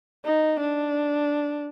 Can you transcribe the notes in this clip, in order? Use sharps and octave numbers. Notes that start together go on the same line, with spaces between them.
D#4
D4